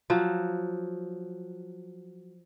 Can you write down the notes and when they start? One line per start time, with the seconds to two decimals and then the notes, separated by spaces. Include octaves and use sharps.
0.10 F3 F#3